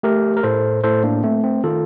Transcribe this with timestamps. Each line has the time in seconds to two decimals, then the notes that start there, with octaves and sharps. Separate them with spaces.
0.03 A3 G4 A#4
0.37 A#4
0.43 A2 A4 C5
0.84 A2 A4 C5
1.04 A#3 D4
1.23 A3 C4
1.44 C4
1.64 D#3 F4 A4